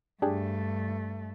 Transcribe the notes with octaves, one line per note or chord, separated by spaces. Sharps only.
G2 A3 D4 G4 G#4